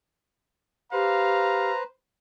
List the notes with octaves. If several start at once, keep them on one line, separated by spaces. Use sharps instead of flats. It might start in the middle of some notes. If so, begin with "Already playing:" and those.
G4 B4 C5 F5 A#5